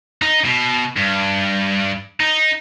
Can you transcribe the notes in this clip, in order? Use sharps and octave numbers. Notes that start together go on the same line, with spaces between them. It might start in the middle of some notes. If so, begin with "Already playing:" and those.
D#4
B2
G2
D#4